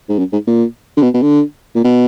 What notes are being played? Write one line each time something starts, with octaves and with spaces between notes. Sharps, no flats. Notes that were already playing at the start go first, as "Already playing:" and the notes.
G#2
F#2
G#2
A#2
D3
B2
B2
D3
A#2
B2